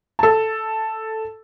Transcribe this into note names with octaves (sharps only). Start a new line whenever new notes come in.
A4 A5